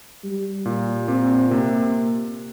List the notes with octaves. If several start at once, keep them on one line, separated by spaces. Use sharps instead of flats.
G3
A#2
A#2 C4
C3 A#3